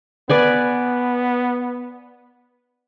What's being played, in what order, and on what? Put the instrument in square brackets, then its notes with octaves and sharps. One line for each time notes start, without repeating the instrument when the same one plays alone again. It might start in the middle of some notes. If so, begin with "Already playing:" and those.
[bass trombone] B3 [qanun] B4 D5 G#5